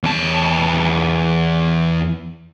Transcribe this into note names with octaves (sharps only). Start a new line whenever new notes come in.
E2 A5